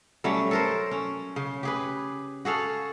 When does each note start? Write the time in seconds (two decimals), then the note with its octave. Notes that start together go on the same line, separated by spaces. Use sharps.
0.24 F#3 G3 A3 C#4
0.51 A4 A#4 C5
0.91 C#4
1.36 C#3
1.63 G4 G#4 B4
2.45 F#4 G#4 A4 F5